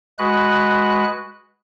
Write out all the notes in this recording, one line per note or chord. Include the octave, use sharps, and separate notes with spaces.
G#3 F#4 B4 F#6